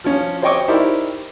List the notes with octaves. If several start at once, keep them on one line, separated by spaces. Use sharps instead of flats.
F3 C#4
C5 C#5 D#5 G5 C#6 D6
D#4 E4 G4 A#4 C5 D5